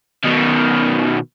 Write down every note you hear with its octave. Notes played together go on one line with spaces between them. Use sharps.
B2 D#3